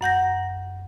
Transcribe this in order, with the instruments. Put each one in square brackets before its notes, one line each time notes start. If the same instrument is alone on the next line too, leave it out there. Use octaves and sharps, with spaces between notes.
[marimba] F#2 F#5 G6 A#6